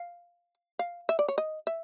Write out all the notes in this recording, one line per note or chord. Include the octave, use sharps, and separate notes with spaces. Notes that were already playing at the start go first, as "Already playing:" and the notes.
Already playing: F5
F5
E5
D5
C#5
D#5
E5